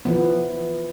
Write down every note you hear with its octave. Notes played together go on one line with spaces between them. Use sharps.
E3 F3 B3